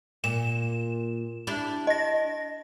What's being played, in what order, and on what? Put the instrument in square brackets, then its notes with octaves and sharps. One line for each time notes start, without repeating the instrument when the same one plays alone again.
[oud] A#2 [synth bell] E7
[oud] D4 E4 G4
[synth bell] D#5 A#6